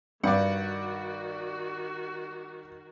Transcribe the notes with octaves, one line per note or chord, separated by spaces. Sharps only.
G2 D#3 F#4 D5 F#5